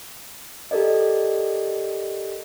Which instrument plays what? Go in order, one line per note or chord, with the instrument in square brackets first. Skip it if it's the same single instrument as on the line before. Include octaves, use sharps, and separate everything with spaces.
[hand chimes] G4 A4 A#4 D5 D#5